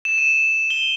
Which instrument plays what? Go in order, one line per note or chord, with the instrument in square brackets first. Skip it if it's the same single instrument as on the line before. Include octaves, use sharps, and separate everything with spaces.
[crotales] E7
D#7
G7